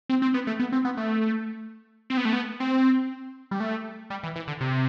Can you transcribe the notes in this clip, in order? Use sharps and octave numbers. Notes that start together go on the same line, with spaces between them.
C4
C4
B3
A3
B3
C4
B3
A3
C4
B3
A3
B3
C4
G3
A3
G3
E3
E3
D3
C3